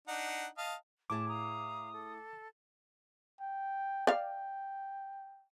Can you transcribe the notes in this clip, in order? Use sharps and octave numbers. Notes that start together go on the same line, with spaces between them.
D4 D#4 F#5
D#5 F5 A5
A2 E4 G#4 A5 D6
F5 A#5 D#6
A4
G5
D5 F5 G5